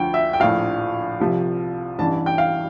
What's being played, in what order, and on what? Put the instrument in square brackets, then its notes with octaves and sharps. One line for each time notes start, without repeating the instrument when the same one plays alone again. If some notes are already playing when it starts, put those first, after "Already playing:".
Already playing: [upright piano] D2 D3 F3 G5
E5
G5
A#1 A2 F3 F5
C2 C3 F3
A1 G2 E3 A5
G5
F5